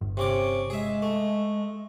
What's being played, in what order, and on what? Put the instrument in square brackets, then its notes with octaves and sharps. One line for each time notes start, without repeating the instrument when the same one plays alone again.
[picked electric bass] G1
[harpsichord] C3 C#4 D6
[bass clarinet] G#3 [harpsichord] G#4 E5
[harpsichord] A3